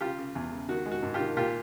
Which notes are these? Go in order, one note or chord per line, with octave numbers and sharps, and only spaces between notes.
C#3 F4 G4
C#3
E2
C#3
D#3 F#4
G#3
F#4
G#2
F4 G4
D#3
A#2 F4 G4